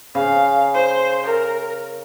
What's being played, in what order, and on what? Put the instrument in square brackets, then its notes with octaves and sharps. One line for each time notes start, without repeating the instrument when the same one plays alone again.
[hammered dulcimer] C#3 [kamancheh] F5
[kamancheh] C5
A#4